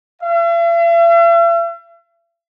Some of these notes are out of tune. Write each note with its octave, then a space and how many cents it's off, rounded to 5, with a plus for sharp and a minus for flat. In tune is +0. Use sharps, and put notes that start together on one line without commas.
E5 +45